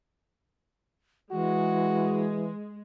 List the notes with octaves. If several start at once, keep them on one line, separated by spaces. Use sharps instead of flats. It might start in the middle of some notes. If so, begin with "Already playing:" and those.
E3 G#3 F#4